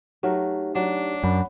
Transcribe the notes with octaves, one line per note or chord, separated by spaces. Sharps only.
F#3 A3 D#4 G4 A#4
F#3 D4
F#2 F#5 B5